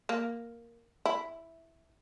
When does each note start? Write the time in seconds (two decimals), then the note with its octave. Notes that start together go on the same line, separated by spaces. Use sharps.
0.09 A#3
1.06 E4